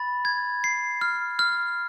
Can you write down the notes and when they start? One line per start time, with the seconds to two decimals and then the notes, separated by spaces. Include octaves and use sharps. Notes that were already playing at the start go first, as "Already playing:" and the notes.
Already playing: B5 A6
0.25 G#6
0.64 C7
1.01 F6
1.39 F6